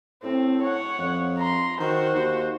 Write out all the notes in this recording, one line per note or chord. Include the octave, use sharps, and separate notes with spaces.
A2 C4
C#5 F#5
F2
A#5 C6
D#3 F#4 C5
D#2